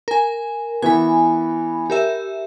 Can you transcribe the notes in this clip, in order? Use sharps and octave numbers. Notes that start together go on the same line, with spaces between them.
A#4 G#5
E3 B3 G#5 B5
G4 A#4 E5